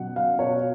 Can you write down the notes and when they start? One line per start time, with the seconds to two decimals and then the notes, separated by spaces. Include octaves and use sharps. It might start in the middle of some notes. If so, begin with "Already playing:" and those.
Already playing: B2 F#3 F#5
0.16 F5
0.39 B2 C#5